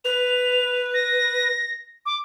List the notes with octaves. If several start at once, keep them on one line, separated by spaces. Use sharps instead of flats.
B4 F7
A#6
D6